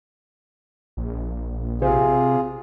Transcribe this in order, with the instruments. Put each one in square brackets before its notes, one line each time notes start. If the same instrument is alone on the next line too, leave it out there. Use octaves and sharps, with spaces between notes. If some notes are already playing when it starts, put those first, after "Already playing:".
[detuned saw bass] A#1
[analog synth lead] C3 [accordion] F4 G#4